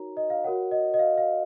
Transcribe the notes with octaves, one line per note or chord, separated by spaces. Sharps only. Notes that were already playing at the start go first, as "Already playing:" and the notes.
Already playing: D#4 F#4 A#4 C#5 A#5
D#5
F5
F#4 A#4 C#5 F#5
D#5
D#5
F5
F5